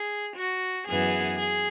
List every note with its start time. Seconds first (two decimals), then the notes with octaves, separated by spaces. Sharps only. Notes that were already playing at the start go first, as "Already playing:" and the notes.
Already playing: G#4
0.35 F#4
0.87 F#2 E3 B3 G#4
1.39 G#4